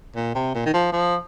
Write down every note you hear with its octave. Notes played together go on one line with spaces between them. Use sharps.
A#2
C3
A#2
D#3
F3
F3